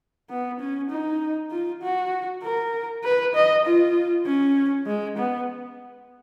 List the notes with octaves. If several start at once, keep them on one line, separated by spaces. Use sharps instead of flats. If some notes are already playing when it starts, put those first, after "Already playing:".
B3
C#4
D#4
F4
F#4
A#4
B4
D#5
F4
C#4
G#3
B3